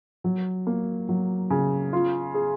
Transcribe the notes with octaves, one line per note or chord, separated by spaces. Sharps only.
F#3
A#3
F#3
C#3
F4
G#4